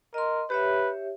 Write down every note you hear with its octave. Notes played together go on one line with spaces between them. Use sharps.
A#4 D#5 C6
G4 B4 C#5 E5